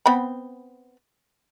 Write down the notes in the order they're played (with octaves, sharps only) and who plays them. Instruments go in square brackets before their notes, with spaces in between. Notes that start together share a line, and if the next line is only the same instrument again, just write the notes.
[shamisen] B3 C4 B5